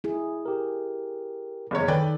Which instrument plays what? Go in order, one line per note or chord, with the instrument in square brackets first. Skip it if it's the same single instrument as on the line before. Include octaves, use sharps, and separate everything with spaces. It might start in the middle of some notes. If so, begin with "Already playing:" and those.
[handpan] E4 G#4
[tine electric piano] G4 A#4
[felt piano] F#1 E2 C#5
[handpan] D#3 A4 [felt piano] B4 D5 G5